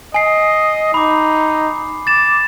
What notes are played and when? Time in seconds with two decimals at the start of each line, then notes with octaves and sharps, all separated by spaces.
0.14 D#5 G#5 C7
0.94 D#4 B5 D6
2.07 D6 A6 E7